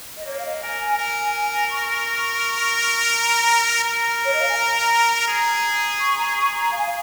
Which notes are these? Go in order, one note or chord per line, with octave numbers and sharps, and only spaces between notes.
D#5
A#3 C#5
F5
D#5
A#4 G#5
G#5
A#4 G#5
C#6
A#5
A#4
C#5
D#5
F5
G#5
A#5
G#4
C#6
A#5
C#6
A#5
F5
G#5
F5